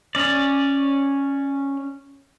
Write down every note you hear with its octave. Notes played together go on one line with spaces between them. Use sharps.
C#4 D5